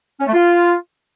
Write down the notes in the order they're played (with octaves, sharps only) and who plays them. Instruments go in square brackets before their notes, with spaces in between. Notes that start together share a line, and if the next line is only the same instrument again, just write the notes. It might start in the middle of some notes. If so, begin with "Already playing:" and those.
[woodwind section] C#4
A3
F4